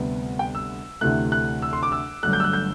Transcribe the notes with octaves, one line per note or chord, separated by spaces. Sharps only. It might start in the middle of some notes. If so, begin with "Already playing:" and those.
Already playing: D2 C3 G3 B3
G5
E6
D2 C3 E3 A3 F#6
F#6
E6
C6
D6
E6
G1 G2 F#3 A3 F#6
G6
E6
F#6
G6